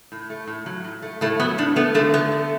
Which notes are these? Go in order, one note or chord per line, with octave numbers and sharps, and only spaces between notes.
A2
A3
A2
F#3
A2
A3
A2 A3
F#3 B3
A2 D4
A3 B3
D3 A3
A3 B3
A3